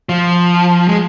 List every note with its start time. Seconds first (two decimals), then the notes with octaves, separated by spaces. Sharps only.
0.09 F3
0.88 G#3